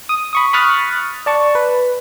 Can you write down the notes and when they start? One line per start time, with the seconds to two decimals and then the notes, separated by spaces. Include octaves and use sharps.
0.09 D#6
0.33 B5 C#6 D#6
0.53 B5 C#6 D#6 F6 F#6 A6
1.26 D5 A5 C#6
1.55 B4